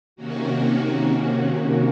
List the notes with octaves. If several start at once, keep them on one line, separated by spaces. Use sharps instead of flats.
C3 D#3 A#3 C#4 F#4